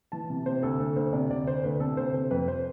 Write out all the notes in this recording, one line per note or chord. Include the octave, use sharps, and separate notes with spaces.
E3 A5
C3
C3 C5
D2 A4
D2 A4
D2 C5
C3 D5
D2 D5
D2 C5
D2 B4
C3 A4
D2 C5
C3 C5
F2 B4
C5